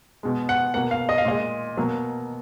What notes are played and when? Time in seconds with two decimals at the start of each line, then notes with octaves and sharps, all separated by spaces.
0.23 B2 G#3
0.49 F#5
0.74 B2 A#3 F#5
0.91 F5
1.09 D#5
1.18 F5
1.25 A#2 G#3 D#5
1.77 B2 F#3 A#3